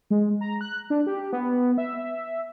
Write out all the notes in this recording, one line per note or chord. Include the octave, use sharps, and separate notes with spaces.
G#3
A#5
F#6
D4
G4
B3
E5